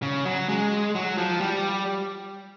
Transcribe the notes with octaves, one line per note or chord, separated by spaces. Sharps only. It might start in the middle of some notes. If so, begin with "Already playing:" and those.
C#3
F#3
G#3
F#3
F3
G3